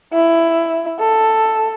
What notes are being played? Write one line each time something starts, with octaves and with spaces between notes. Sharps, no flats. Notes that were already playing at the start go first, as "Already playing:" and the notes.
E4
A4